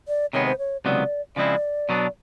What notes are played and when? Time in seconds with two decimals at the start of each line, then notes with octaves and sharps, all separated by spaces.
0.08 D5
0.33 C3 D#3 G#3 B3 C#5
0.46 C5
0.58 C#5
0.85 C#2 C3 D#3 F#3 B3 D5
1.36 C#3 F3 G#3 C4 E4 D5
1.89 B2 F#3 B3 D4